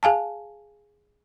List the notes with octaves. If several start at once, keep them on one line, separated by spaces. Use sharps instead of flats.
G#4 F5 G#5 A5